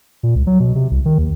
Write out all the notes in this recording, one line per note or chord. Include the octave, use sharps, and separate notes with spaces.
A#2
C#2
F#3
B2
C3
C2
D#3
D#2